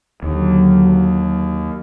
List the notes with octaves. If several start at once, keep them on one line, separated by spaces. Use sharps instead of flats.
D#2 D3 D#3 F#3